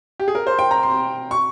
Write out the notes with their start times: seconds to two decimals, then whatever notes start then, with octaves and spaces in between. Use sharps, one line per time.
0.20 G4
0.28 G#4
0.35 A#4
0.47 C5
0.59 G5
0.71 A#5
0.83 C6
1.31 C#6